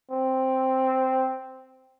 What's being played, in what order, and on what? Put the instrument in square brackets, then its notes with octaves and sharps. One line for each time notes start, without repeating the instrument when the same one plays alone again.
[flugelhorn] C4